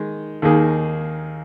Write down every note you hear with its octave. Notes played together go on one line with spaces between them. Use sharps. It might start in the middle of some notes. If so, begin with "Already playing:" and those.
Already playing: D#3 G#3
D#2 D#3 A#3 G#4